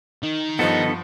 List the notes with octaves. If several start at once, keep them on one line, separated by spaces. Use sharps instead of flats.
D#3
G2 F3 B3 A4 D#5 F#5